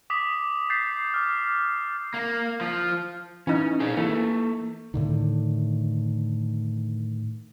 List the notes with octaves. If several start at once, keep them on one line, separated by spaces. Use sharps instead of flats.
D6 D#6 B6
G6 A6 B6 C7
D6 F6
A#3
F3
E3 C#4 D#4
D4 G#4 G#5
E3 A#3 A4
A2 D3 D#3